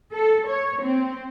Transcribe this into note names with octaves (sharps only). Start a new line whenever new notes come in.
A4
C#5
C4